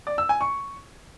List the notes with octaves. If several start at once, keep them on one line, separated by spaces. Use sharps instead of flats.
D5
E6
G#5
C#6